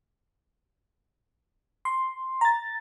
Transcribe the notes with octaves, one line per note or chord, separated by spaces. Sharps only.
C6
A#5 A6